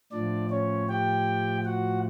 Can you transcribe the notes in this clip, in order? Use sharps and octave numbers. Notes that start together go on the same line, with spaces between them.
A2 F3 D4 D5
C#4 C#5
G4 G5
F#4 F#5